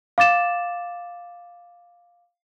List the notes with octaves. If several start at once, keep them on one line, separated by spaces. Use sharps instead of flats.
F5 D6 A6 E7